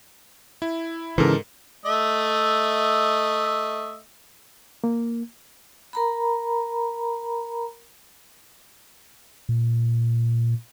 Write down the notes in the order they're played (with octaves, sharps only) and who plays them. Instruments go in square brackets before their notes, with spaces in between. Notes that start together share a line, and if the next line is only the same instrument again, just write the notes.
[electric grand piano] E4
[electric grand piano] G#2 A4 A#4 [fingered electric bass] C#3 E3
[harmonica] A3 D#5 E5
[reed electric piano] A#3
[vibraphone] A#4 A#5 B5
[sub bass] A#2